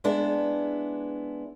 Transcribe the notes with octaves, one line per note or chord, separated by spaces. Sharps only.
G#3 B3 D4 E4